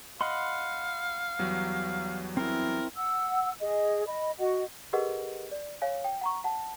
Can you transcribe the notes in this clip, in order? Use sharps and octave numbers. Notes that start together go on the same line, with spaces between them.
D#5 F5 F#5 B5 C6
E2 F#3 G3
C4 E4 A#4
F#5 E6
G#4 D#5
D#5 B5
F#4 D#5 F#5
G4 G#4 A#4 B4 D#5 F#5
D5
C#5 F5 G#5
G5
F#5 A#5 C#6
F#5 A5